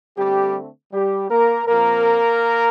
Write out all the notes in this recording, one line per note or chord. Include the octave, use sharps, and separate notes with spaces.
D3 G3 A3 C4 G4
G3 G4
A#3 A#4
A#2 F3 A#3 C4 A#4